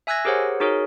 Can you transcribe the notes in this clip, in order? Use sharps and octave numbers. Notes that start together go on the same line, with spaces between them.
E5 G#5 E6 F#6 G#6 A#6
G4 G#4 A#4 C5 C#5 F#5
D#4 F#4 G#4 A#4 C#5